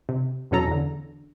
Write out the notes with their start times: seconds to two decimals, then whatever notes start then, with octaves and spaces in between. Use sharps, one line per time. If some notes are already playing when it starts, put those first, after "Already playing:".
0.09 C3
0.51 E2 B2 F#3 C#4 A4 A#5
0.68 E2 D3